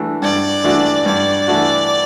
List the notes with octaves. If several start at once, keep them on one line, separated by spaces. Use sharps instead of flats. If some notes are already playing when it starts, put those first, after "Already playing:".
Already playing: E3 A3 D4 F#4
G2 D5
E3 A3 D4 F#4
G2 D5
E3 A3 D4 F#4